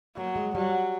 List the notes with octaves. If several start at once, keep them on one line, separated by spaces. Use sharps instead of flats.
F#3 A#3
G#3
F#3 G3